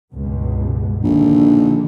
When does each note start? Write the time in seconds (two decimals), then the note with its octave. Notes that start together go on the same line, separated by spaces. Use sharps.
0.12 C#2 G2 B2
1.04 A#1 D3 D#3